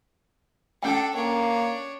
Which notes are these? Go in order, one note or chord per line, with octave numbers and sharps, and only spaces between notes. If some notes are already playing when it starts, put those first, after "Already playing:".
C#4 D4 A4 F#5 G5
A#3 D4 C#5